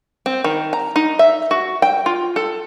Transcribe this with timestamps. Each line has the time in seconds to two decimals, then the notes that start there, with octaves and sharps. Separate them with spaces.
0.26 C4
0.44 D#3
0.73 A#5
0.96 D#4
1.19 E5
1.51 F#4
1.82 G5
2.06 F4
2.36 A4